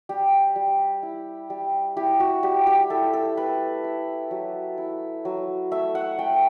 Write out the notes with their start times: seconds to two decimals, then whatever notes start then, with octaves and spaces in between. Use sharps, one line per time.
0.09 G3 G4
0.56 G3
1.03 E4
1.50 G3
1.97 E4 G4
2.20 F#4
2.43 G3 G4
2.67 G4
2.90 E4 A4
3.13 A4
3.37 A3 B4
3.84 E4
4.31 F#3
4.78 E4
5.25 F#3
5.72 A3 E5
5.95 F#5
6.19 A3 G5